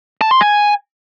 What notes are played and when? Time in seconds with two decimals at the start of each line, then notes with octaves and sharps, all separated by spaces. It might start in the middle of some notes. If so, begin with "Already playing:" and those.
0.21 A5
0.31 C6
0.41 G#5